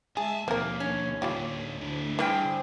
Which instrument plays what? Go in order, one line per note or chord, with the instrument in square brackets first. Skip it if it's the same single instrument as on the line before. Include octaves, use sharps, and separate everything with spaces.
[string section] G#3 E5 [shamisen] G#4 [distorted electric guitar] G#5 A5
[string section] D#2 [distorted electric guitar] B2 F3 [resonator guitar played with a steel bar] A#3 [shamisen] C4 A#4
[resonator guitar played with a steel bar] C#4
[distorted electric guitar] A2 D3 [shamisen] G3 F4 G4
[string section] D2 [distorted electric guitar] D3 E4
[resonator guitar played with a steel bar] G2 G3 G5 [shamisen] E3 [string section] G#4 C5